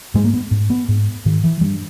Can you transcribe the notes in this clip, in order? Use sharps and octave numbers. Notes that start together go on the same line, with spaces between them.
G#2 G#3
A#3
B3
G#2
B3
G#2
G#2 D#3
E3
G2 G3